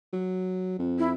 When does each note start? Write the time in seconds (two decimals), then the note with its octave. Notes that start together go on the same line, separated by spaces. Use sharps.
0.13 F#3
0.79 F2
0.99 E4